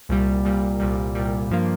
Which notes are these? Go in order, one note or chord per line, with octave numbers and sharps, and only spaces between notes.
C2 A#2 G3
C2 A#2 G3
C2 A#2 G3
C2 A#2 G3
G2 F3 A#3